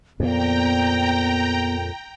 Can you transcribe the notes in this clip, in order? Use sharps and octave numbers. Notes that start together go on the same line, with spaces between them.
F2 A#2 B3 G5 A#5